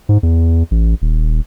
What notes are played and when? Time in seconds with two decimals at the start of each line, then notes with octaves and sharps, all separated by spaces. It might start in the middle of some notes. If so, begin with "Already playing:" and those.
0.09 G#2
0.23 E2
0.71 A1
1.02 D#1